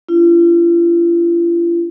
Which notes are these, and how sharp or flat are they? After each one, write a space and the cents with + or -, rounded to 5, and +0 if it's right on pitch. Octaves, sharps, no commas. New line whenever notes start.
D4 -25 F4 -40